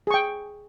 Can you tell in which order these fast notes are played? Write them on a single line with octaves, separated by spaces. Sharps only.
G#4 C#6 G5